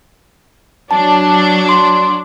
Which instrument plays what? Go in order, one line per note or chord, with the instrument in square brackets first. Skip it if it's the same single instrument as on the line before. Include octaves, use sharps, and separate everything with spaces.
[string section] F#3 D4 [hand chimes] A5
[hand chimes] C6